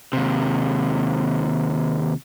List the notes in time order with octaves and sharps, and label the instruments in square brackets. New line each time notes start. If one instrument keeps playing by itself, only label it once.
[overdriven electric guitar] D#2 C3